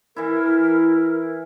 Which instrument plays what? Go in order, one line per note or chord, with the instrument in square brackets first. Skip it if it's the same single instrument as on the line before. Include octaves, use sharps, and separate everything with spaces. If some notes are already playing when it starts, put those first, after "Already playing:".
[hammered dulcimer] E3 E4 [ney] A#4